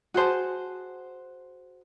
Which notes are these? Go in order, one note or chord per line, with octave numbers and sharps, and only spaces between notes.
F#4 G#4 C5 A5